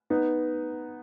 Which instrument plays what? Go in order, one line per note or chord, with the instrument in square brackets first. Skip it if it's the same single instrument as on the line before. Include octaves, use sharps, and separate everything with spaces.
[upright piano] B3 D#4